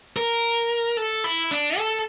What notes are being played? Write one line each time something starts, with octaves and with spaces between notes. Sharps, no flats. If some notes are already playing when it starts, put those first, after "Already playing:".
A#4
A4
E4
D4
A4